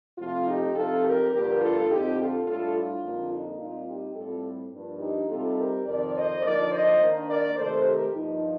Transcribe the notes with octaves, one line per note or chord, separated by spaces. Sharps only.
F2 C3 F3 A3 F4
D#4 G4
C3 F3 C4 D#4 F4 A4
G4 A#4
G2 D3 F3 A#3 D4 G4 A#4
F4 A4
F2 D3 F3 C4 D#4 G4
F4 A4
A2 G3 D4 F4 A4
F4
F2 D3 G3 A#3 D#4
D#4
A#2 G3 C4 D#4 F4
D#4 G4
A2 G3 C4 F4 A4
G2 F3 A#3 D4
D#4 G4
C3 G3 C4 D#4 F4 A4
G4 A#4
F2 C3 D#3 A#4 D5
C5 D#5
D3 F3 A#3 D#4 A#4 D5
C5 D#5
D#3 A#3 D4
A#4 D5
C3 D#3 A3 A4 C5
G4 A#4
G2 F3 A#3 D#4